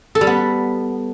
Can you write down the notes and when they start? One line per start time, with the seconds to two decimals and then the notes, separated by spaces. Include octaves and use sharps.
0.15 A4
0.21 G3
0.27 B3